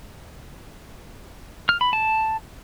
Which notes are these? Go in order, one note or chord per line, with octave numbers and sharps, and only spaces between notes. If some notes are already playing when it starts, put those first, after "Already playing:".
F6
B5
A5